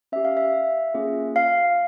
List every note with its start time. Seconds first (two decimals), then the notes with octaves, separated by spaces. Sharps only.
0.12 C#4 G4 E5
0.25 F5
0.37 E5
0.94 A#3 C#4 F4 G#4
1.36 F5